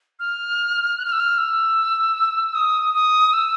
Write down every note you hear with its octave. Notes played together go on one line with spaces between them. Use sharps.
F6
F#6
F6
E6
F6
E6
D#6
D#6
E6